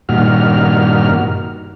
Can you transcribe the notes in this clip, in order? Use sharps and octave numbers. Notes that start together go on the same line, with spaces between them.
G2 A#2 D#3 F#4 F6